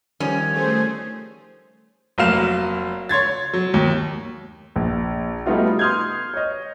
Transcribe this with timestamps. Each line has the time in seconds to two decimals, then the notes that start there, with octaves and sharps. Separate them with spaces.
0.20 D#3 F3 G3 C#4
0.53 A3 G#4 C5
2.18 F1 F#3 A#3 F5 E7
3.09 C#5 C6 G#6 A6
3.54 F#3
3.74 D#2
4.76 A#1
5.46 G3 A3 B3 D#4 F4 F#4
5.79 C6 D#6 F6 G6 G#6
6.34 C#5 D#5